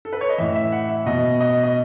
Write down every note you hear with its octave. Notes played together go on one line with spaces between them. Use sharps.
A4
B4
C#5
D#5
A2 E3 E5
E5
F#5
E5
B2 D#5
D#5
D#5